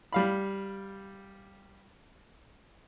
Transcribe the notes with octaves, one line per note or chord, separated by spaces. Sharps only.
G3 F5 B5